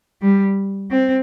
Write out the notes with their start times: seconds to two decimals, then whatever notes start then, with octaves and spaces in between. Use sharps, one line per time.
0.22 G3
0.91 C4